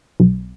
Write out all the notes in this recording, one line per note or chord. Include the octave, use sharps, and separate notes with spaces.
B1